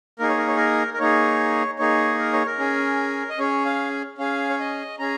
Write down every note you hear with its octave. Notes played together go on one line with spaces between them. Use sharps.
A#3 D#4 G#4 A#4
C#5
A#4
C#5
A#4
A#4
A#3 D#4 G#4 C#5
A#3 D#4 G#4 C#5
A#4
C#5
A#4
C#4 G#4
D#5
C#4 G#4 C#5
F5
C#4 G#4 F5
C#5
D#5
C#4 G#4 A#5